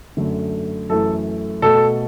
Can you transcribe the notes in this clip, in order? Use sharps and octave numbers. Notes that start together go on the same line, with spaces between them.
F#2 D3 A3
F#2 E3 A3 A4
B2 A3 A4